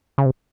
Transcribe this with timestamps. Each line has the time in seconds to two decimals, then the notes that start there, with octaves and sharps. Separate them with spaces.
0.18 C#3
0.26 C3